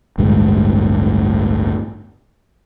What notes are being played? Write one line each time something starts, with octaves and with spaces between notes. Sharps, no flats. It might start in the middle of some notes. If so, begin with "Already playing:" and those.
A1 D2 G2 G#3